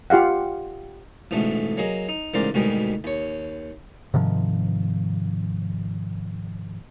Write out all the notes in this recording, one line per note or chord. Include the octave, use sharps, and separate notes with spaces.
F4 G4 F5 F#5
A1 G#2 B2 D3 A3
F#3 A#3 G#4 D#5
D#4
A1 G#2 C#3 A#4 C5 D5
D2 G#2 B2 D#3 G3 G#3
D#2 C#5
G#2 C3 D#3 F3